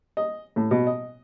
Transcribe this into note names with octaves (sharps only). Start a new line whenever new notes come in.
D#5
A2
B2
D#5